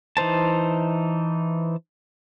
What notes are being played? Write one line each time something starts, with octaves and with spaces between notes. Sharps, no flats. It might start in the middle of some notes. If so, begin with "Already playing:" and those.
E3 D#4 C5 A5